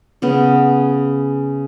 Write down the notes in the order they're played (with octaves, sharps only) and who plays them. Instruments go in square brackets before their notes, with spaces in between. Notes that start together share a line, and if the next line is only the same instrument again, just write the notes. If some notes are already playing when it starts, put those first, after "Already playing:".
[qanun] C#3 B3